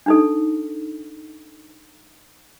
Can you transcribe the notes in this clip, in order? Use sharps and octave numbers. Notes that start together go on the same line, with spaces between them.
D4 D#4 A4